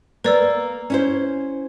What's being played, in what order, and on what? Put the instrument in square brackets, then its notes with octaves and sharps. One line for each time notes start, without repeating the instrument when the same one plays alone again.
[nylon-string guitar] A#3 [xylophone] B4 D5 E6
[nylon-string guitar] C#4 E4 C5